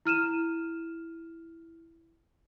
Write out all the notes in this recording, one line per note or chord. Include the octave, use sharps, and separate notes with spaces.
E4 F6 D#7 E7